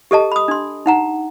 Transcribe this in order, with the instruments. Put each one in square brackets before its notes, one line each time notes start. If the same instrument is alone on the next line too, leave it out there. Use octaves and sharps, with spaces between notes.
[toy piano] G4 A4 D#5 A5
B5 D#6
D4 C6
D#4 F#5 A#5